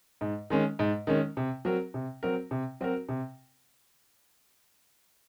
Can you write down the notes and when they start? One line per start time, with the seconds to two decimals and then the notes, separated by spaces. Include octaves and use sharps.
0.21 G#2
0.50 D#3 G#3 C#4
0.79 G#2
1.07 D#3 G#3 C#4
1.37 C3
1.65 F#3 C4 F#4 A#4
1.94 C3
2.23 F#3 C4 F#4 A#4
2.51 C3
2.81 F#3 C4 F#4 A#4
3.09 C3